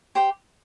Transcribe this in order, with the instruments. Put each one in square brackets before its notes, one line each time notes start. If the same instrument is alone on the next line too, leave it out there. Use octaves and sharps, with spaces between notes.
[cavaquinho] G4 C5 G5